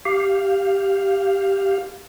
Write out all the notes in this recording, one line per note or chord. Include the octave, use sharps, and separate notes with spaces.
G4 F5